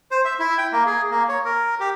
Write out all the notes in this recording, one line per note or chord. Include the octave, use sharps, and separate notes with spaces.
C5
E5
E4
G5
A#3
G#4
A#3
C#5
A#4
G4